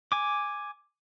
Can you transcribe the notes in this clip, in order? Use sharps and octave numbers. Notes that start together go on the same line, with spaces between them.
G#5 D6